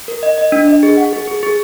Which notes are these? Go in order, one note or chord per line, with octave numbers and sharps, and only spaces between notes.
A#4
D#5
D#5
D4
D#5
G#4
F#5
G#4
G#4
G#4